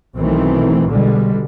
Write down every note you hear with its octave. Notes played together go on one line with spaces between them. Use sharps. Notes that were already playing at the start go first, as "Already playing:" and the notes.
B1 D#3 E3 A3 C4
B2 D3 G3 G#3